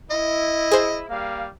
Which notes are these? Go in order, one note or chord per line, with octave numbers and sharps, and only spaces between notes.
E4 D#5
G#4 C5
G3 A#3 F5